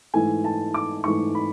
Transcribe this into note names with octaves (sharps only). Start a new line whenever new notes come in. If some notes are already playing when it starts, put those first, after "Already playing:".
G#2 E3 A3 G#5
A5
D6
G#2 E3 A3 C#6
B5